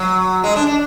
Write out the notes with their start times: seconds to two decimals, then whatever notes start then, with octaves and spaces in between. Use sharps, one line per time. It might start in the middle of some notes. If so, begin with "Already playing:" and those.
Already playing: F#3
0.44 G#3
0.56 D4
0.67 D4